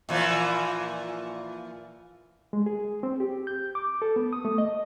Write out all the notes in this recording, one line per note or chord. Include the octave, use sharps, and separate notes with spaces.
A#2 E3 F3
G#3
G#4
C4
G4
G6
D6
A4
B3
D#6
A3
D#5